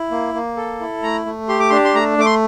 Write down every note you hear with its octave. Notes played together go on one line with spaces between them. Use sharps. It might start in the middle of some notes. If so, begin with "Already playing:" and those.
Already playing: E4
A#3
A#3
A4
E4
A3 A#5
A3
G4 C6
D6
D4 C6
C6
A3 A#5
A3 D6
C6